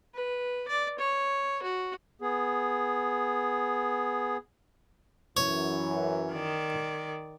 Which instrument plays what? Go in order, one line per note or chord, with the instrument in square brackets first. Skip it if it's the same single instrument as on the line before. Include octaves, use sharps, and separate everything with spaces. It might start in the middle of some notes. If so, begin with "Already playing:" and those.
[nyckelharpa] B4
D5
C#5
F#4
[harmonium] B3 G#4
[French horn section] F#2 E3 [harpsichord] C#5
[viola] D#3 D5